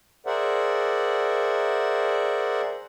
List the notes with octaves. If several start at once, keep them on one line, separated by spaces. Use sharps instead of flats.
G#4 A#4 C5 D5 E5 F#5